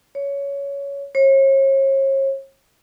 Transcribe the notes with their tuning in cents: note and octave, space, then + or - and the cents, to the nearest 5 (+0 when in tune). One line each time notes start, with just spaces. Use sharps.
C#5 +15
C#5 -40